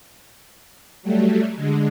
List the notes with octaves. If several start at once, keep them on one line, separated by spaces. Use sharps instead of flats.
F#3 G3 A3
D3 G#3